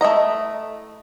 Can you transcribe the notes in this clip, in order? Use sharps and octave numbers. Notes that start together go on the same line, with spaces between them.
A3 E4 D#5 A#5